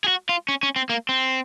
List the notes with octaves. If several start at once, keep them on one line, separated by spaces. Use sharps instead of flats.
G#4
F#4
F4
C#4
C#4
C4
A#3
C4